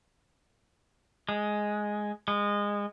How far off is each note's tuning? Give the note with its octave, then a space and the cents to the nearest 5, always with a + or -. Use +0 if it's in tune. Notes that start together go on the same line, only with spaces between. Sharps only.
G#3 +5
G#3 -20